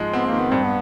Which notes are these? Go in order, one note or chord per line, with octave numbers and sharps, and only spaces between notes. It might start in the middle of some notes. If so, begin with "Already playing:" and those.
Already playing: G#2 F3 G#3
B3 C4
A#3
D#3
B3
G2 C4
B3